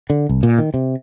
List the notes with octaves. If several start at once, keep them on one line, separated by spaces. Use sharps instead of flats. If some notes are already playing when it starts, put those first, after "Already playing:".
D3
C2
A#2
D#3
C3